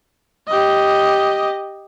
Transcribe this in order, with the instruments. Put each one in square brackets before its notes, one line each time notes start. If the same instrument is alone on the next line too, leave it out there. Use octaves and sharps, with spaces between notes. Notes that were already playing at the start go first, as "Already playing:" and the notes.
[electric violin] G4 D#5